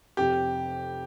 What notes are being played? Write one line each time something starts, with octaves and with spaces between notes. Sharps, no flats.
F1 F2 C3 G4